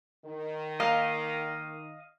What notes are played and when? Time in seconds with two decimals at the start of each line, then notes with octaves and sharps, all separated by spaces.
0.25 D#3
0.80 A#3 D#5 F5